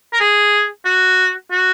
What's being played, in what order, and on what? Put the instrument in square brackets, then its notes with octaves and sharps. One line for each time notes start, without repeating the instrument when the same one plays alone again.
[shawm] A#4
G#4
F#4
F#4